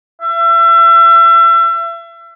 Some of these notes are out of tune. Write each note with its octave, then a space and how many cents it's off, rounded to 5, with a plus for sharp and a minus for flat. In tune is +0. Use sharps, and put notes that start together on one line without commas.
E5 +35